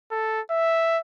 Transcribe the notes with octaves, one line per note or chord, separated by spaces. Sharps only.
A4
E5